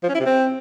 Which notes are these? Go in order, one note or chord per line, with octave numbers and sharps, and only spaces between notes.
F3
C#4
E4
C3
C4